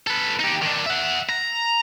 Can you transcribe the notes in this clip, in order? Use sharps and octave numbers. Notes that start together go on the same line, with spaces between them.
A4 B4
D#4 G4
D#3 D4
E5 F#5
A#5